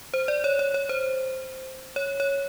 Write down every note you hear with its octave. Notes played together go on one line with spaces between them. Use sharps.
C5
D5
C#5
C#5
C#5
C5
C#5
C#5